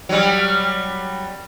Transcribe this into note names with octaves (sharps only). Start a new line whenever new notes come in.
F#3 G3